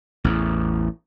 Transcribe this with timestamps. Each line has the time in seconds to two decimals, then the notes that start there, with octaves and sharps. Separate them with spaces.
0.24 A1 E2